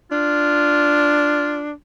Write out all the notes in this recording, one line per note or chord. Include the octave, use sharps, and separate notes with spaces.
D4 F4